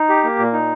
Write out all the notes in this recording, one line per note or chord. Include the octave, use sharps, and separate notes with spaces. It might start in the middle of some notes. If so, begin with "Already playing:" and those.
Already playing: D#4
G4
A#3
A#2
D#4